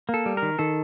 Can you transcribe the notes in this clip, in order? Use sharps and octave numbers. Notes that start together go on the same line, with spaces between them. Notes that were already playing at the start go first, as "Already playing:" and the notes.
A#3
A4
G3
A#4
D#3
D#3 A4